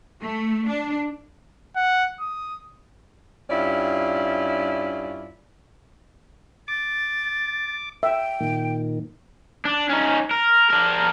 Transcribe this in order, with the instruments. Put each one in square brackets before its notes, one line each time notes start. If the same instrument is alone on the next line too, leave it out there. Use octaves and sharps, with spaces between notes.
[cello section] A3
D4
[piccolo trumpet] F#5
D#6
[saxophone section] G2 C#4 E4 F4 D5
[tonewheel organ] D6 [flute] A6
[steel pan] E5 [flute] G5
[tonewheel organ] A#2 D#3
[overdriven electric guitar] D4
C#4 D#4
A#4
D4 A#4